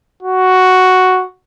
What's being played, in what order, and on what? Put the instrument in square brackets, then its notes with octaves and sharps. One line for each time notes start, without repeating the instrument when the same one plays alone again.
[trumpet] F#4